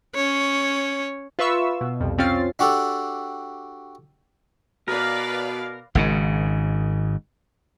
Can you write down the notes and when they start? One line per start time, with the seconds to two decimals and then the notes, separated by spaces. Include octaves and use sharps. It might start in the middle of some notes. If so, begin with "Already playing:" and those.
0.14 C#4 C#5
1.39 F4 B4 E5 C#6 E6
1.81 B2
2.00 C2 F2
2.18 F2 C4 C#4 F4 A6 C7
2.59 D4 F#4 G4 A4
4.88 B2 A#4 B4 D5 F5
5.95 G#1 G#2 C#3